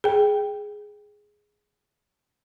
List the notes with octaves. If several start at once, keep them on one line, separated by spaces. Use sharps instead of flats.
G#4 G5